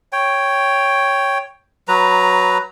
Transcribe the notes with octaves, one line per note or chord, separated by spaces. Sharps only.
C#5 G5
F#3 B4 A#5